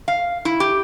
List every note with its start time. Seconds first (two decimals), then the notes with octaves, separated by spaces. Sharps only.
0.08 F5
0.45 E4
0.60 G4